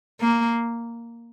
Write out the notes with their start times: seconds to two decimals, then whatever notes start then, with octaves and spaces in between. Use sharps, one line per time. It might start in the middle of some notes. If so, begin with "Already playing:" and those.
0.21 A#3